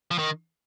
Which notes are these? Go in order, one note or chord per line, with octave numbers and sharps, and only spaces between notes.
F3
D#3